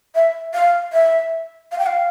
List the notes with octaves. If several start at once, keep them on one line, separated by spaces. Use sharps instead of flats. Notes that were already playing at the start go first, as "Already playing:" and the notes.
E5
F5
E5
F5
G5
F5